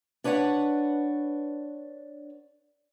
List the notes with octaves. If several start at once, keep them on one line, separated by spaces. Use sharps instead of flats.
D4 B4 C#5 D#5 F#5